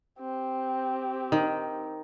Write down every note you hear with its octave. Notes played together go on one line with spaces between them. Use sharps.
C4 G4
D#3